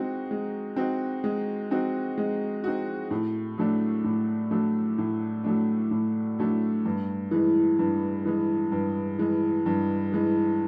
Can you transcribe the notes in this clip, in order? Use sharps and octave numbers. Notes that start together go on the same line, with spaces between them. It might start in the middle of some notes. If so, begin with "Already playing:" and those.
Already playing: G#3 C4 D#4 F#4
G#3
C4 D#4 F#4
G#3
C4 D#4 F#4
G#3
C4 D#4 F#4
A2
F#3 A3 D4
A2
F#3 A3 D4
A2
F#3 A3 D4
A2
F#3 A3 D4
G2
E3 G#3
G2
E3 G#3
G2
E3 G#3
G2
E3 G#3